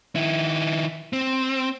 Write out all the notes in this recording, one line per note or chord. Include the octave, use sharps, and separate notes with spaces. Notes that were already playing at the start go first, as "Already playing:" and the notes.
D#3 E4
C4